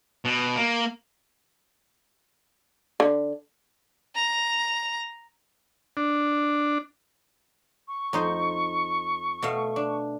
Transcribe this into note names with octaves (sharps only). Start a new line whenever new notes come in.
B2
A#3
D3
A#5
D4
C#6
F2 D#4 C5
B2 A3 F5
D4